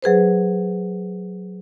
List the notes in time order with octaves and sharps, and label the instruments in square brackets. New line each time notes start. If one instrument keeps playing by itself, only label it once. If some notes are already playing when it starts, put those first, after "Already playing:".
[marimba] F#3 G#4 B4 C5